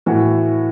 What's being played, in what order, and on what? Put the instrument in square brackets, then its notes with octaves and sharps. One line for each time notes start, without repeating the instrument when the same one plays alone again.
[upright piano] A2 E3 F#4